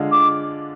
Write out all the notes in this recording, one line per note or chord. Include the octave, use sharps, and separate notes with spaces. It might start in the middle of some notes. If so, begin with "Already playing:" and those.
Already playing: D3 G#3 D4 F4
D6